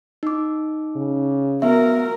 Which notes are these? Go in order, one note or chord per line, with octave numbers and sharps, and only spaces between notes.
D#4 D6
C#3
B3 F#4 A#4 E5